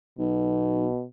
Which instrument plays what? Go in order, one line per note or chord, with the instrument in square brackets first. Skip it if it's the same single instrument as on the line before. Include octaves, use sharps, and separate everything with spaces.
[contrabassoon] B1 [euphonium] B2